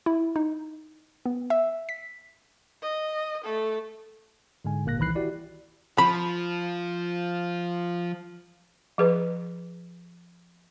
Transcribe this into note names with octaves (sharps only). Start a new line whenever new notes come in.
E4
D#4
B3
E5
B6
D#5
A3 A4
G#2 D3 G#3 G#5
G1 A#2 A#3 F#6 A#6
C2 D#3 E3 B5 F#6 C7
E4 F#4 G4 D5
F3 B5
F3 G#4 B4